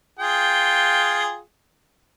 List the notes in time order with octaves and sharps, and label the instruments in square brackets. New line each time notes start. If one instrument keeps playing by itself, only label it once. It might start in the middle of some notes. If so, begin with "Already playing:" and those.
[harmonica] F4 G#4 G5